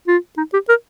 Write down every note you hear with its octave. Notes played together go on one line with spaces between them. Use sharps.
F4
D#4
G4
A#4